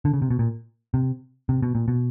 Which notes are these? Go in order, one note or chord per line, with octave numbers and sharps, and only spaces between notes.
D3
C#3
C3
B2
A#2
C3
C3
B2
A#2
B2